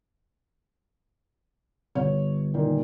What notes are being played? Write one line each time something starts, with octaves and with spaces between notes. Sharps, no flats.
G1 C#5
A#2 D#3